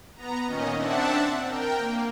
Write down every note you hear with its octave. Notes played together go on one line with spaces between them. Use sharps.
B3 A#5
A#2 D#3 C#4 D#5
C4 D4 E5 F#5 A5
A#4 G5
A#3